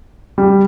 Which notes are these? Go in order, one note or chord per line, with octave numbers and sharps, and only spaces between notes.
G3